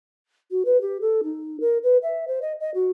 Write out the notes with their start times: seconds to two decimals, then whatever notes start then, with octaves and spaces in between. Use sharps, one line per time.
0.51 F#4
0.65 B4
0.81 G4
1.01 A4
1.23 D#4
1.60 A#4
1.83 B4
2.03 E5
2.27 C5
2.42 D#5
2.60 D#5
2.74 F#4